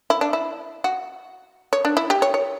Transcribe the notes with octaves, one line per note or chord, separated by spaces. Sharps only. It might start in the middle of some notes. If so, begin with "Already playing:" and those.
E4
D4
E4
F#4
C#5
D4
E4
G4
C#5
C#5